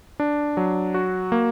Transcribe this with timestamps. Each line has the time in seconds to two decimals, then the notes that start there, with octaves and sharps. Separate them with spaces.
0.20 D4
0.57 F#3
0.94 F#4
1.32 A#3